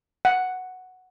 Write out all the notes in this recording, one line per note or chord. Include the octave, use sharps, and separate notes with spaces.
F#5